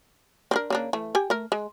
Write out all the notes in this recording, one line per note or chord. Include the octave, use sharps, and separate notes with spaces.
C4 D4 A#4
C#3 A#3 D4
E3 A3
G4 G5 G#5
A3 A#4
G#3